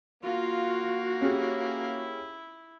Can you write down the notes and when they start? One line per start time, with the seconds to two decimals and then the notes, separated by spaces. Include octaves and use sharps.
0.23 A#3 F4 F#4
1.21 C#4 E4 G4 G#4